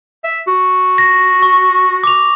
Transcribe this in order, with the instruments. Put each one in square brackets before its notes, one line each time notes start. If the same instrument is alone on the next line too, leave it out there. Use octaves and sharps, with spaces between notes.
[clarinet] E5
F#4
[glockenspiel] A#6
C#6
D6 F7